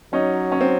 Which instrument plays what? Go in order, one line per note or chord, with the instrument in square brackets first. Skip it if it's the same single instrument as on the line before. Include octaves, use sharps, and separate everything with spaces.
[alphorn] F#3 [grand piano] C#4 D#4
[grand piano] C#4
C4